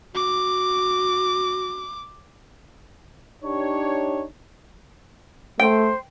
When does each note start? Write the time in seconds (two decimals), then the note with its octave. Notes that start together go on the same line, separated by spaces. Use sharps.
0.15 F#4 D6
3.44 D4 D#4 G4 C#5
5.60 A3 C5 G5